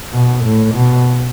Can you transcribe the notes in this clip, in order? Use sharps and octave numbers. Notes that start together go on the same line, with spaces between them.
B2
A2
B2